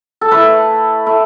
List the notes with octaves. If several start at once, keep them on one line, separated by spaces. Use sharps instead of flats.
A4
A3 E4 B4
A3 E4